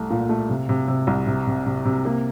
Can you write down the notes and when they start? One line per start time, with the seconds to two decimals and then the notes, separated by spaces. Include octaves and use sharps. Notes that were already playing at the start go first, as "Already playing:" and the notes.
Already playing: C2 A3
0.10 A#2
0.29 A3
0.49 C3
0.69 C3
0.88 C3
1.07 C2
1.27 C3
1.47 C3
1.67 C3
1.85 C3
2.05 A#3